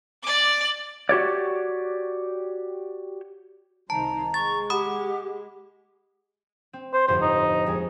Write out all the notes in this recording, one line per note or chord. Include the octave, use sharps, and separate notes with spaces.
D5 D6
F#4 G4 C#5 D5
C2 D#3 C5 A5 A#5
G#3 C#6 A6
G4 F#5 B5 D#6
C4
C5
G1 F2 A2 C5
D#4
F2 G#3 G#5